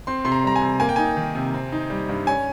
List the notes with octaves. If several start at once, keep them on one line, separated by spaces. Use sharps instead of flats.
C4 C6
C3 C6
A#5
G3 A#5
G#5
C3
A#3 G#5
G5
D#4 G#5
D#3
C3
C4
D#4
G3
G2
C#4 G#5